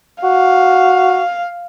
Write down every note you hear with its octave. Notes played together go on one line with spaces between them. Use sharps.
F#4 F5